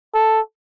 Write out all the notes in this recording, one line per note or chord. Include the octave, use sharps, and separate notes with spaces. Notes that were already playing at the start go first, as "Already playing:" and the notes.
A4